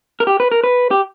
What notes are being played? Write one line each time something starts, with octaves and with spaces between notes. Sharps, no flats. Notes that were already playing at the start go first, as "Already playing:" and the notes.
A#4
G4
B4
A#4
B4
G4